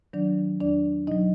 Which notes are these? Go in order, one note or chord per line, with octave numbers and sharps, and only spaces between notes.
D#3 F#3 D4 D5
E2 D4 D5
B2 F#3 D#4 D#5